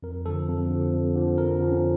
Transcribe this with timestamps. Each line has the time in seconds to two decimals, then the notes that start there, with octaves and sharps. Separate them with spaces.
0.03 F2 A#4
0.25 D3 F3 A4
0.48 F2
0.70 D3
0.75 F3
0.94 F2
1.15 D3 F3
1.38 F2 A#4
1.60 D3 F3
1.68 C#4